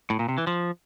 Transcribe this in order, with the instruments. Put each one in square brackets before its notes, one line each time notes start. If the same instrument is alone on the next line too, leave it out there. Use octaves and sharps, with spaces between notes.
[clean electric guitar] A2
A#2
C3
E3
F3